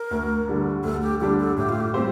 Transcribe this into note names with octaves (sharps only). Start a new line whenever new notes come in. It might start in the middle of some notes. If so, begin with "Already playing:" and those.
Already playing: A#4
D2
D3 G3 D4
D2 A4
G4
D3 G3 D4 G4
A4
A2 G4
F4
G4
G3 C4 F4 G4 C5